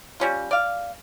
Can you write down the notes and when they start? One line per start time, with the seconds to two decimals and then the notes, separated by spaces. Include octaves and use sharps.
0.20 G3 C#4 F4
0.51 D5 F5